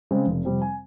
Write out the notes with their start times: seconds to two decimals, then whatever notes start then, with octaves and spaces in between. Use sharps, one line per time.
0.11 C#3 G#3 C4
0.27 F1
0.45 F2 C3 G3 C4
0.62 G#5